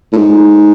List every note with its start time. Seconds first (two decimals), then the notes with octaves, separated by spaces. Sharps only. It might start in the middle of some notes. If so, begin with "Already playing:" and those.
0.13 A2
0.17 G#2